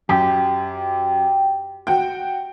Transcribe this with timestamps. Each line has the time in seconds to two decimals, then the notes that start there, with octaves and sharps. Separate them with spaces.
0.09 F#2 G4
1.87 F#4 G5